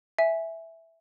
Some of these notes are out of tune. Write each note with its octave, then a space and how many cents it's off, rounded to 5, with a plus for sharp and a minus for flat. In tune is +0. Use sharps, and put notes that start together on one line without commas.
E5 +0 G#5 +0